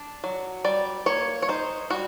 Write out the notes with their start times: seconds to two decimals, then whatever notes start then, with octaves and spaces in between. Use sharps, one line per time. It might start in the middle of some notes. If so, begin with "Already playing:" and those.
Already playing: D4
0.24 F#3
0.64 G3 D5
1.06 A#3 C#5
1.42 C#5
1.49 D#4 C5
1.90 G3 F#4